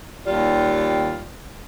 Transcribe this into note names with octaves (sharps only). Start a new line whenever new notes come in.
D#2 G3 F4